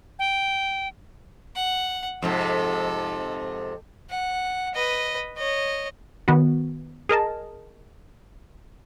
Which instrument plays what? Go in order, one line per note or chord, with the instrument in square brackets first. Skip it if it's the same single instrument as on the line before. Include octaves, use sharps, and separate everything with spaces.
[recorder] G5
[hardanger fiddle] F#5
[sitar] F2 G#2 C3 [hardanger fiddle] A4
[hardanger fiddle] F#5
B4 D#5
C#5 D#5
[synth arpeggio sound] D#3 B3 F#4
G#4 A#4 D#5 A5